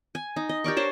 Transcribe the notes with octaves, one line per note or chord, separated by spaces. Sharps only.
G#5
D#4
D#5
G4 A#4 D5 C#6
D4 C5 C#5 A5